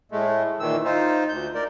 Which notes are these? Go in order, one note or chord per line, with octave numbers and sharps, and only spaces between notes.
A2 G#3 A3
A#2 D#3 E3 E6
D#4 F4 C5
D2 G6
A#4 D5